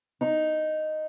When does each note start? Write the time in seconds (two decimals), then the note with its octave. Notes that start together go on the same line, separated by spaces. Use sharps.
0.21 D#4